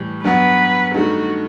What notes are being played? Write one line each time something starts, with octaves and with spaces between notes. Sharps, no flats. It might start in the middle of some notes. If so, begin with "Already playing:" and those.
Already playing: A2 E3 G3
G2 F#3 B3 B4
G2 D#3 A3 F#4